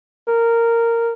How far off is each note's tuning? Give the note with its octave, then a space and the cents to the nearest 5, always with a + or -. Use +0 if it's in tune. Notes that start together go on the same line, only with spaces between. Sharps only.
A#4 -10